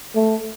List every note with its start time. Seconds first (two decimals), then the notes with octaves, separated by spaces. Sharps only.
0.15 A3